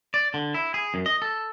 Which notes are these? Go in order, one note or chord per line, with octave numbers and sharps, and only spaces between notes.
D5
D3
E4
G#4
F#2
D#5
A4